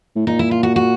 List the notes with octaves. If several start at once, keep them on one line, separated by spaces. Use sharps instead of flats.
A2
A#2 D#4
E4
F4
F#4
F#4